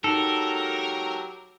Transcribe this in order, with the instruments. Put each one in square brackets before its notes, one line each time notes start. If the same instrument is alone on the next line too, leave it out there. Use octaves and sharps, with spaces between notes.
[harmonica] F#3 G4 [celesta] D#4 [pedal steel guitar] A4 [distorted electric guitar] A#4